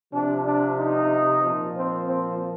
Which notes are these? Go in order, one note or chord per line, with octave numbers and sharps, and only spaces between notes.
C3 F3 D4
D4
D#4
A#2 F3
C4
C4